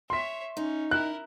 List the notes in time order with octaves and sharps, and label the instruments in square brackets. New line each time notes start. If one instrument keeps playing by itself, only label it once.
[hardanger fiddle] C#5 E5 [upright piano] C6 B6
[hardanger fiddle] C#4 [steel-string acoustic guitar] D#4
[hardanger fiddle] E4 A#4 [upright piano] F#6